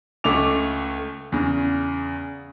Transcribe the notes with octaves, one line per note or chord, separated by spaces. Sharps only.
C#2 A3 C#4 A4 D6 F7
E2 C#3